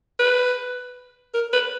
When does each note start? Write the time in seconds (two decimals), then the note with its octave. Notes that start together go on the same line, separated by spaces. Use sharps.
0.19 B4
1.34 A#4
1.53 B4